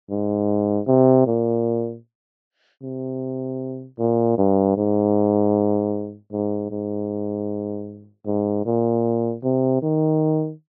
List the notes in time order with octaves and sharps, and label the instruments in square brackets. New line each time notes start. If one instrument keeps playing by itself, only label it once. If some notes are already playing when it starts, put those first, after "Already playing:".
[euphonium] G#2
C3
A#2
C3
A#2
G2
G#2
G#2
G#2
G#2
A#2
C3
D#3